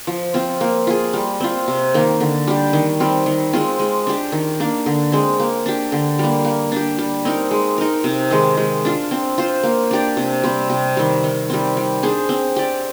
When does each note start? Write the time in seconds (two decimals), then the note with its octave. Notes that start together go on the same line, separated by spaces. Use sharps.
0.07 F3
0.34 C4 F4
0.61 A#3
0.87 F4 G#4
1.14 G3
1.40 C4 F4
1.68 C3
1.94 D#3 A#3
2.20 D3
2.47 G3 D4 G4
2.73 D#3
3.00 G3 C4
3.26 D#3
3.53 G#3 C4 F4
3.79 G#3
4.07 D4 G4
4.32 D#3
4.60 A#3 D4
4.86 D3
5.12 G#3 C4
5.40 A#3
5.66 D4 G4
5.92 D3
6.19 G3 A#3
6.45 A#3
6.72 D4 G4
6.98 G3
7.25 C4 D#4 A#4
7.51 G#3
7.78 D#4 A#4
8.04 C3
8.31 D#3 G#3
8.57 G#3
8.85 D4 F4
9.11 C4
9.38 F4 C5
9.63 A#3
9.91 D4 G4 D5
10.17 C3
10.43 G3 C4
10.70 C3
10.97 D#3 G3
11.24 D#3
11.50 G3 C4
11.77 G3
12.03 D4 G#4 C5
12.29 C4
12.56 G4 D5